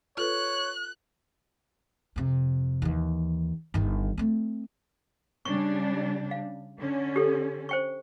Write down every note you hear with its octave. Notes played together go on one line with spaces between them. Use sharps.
F4 A4 B4 C#5 F#6
F2 C3
D#2 E3
G1 D#3
A3 C4
C#3 G3 D4 C#6
F5
D3 C#4
G4 A4
C5 G5 C#6